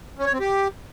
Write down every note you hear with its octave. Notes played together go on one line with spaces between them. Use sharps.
C#4
C#5
C4
G4